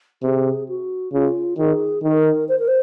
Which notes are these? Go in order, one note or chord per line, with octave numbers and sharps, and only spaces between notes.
C3 G#4
F#4
C#3 F4
D#3 G#4
D#3 A#4
C5
A#4
C5